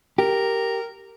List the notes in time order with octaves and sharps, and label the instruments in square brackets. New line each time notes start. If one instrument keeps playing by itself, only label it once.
[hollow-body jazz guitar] G4 [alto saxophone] A#4